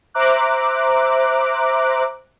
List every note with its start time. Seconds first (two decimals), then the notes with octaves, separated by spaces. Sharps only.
0.14 C5 E5 A#5 D6 F#6